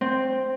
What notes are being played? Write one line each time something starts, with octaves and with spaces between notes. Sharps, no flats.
C4